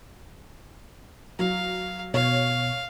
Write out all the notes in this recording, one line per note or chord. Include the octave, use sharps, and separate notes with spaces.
F#3 F5
B2 C#5 F5